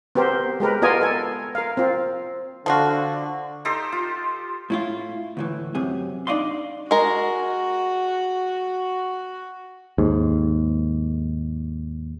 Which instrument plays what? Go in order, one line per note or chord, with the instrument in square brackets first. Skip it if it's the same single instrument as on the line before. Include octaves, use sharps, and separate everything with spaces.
[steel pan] B3 C4 G4 A#4 C5
G#3 G4 A#4 B4
B3 F4 A#4 D5 D#5 G#5
A4 G#5
A#4 F5
C4 F4
[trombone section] D3 [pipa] F3 F4 F#4
[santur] D#4 G4 A4 C5
F4
[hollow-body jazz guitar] A2 E4 F4
D2 A2 E3
F#2 C3 G#4
D4 D#4 D5 D#5 F5 C6
[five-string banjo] G#3 A#4 [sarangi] F#4
[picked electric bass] D#2 G#2